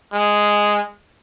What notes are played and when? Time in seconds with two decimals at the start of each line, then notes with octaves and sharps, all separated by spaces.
0.13 G#3